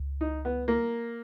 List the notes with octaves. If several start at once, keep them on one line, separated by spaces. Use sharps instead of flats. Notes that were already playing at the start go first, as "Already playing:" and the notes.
Already playing: C#2
D#4
B3
A#3